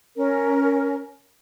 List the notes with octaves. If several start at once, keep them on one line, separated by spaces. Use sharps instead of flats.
C#4 A#4